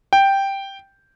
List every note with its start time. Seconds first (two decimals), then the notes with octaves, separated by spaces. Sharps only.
0.13 G5